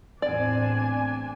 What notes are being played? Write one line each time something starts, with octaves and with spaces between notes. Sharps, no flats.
E2 A2 C4 D4 D5 G#5